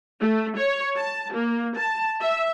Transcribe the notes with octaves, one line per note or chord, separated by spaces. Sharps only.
A3
C#5
A5
A#3
A5
E5